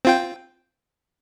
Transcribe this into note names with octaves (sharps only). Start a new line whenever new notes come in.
C4 F4 G5